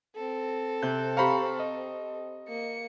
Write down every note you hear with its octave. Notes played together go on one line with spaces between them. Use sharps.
C4 A4
C3 F#6 G6
G4 C5 F5 A#5 B5 C#6
D#5
A#3 C#7